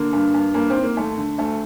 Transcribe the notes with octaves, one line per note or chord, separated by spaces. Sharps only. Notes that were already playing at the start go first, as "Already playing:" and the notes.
Already playing: D3 A#3
G2
G2
G2 A#3
C4
D#3
A#3
D#2 A3
D3
D2 A3